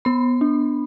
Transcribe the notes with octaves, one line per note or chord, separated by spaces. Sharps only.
B3 B5
D4